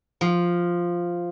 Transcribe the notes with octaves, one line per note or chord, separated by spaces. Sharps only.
F3